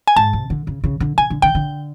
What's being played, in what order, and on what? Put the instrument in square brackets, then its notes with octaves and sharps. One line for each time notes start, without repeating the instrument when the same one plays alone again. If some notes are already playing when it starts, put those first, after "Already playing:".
[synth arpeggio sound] G#5
[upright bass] G#2 [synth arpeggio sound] A5
[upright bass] C3
D3
C#3
C#3
D3
[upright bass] C#3 [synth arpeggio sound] G#5
[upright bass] D3
[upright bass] D3 [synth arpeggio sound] G5
[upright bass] D3